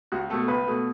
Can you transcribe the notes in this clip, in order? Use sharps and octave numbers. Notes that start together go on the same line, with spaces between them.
C#2 F#4
B2 A3 A4
C#2 B4
B2 A3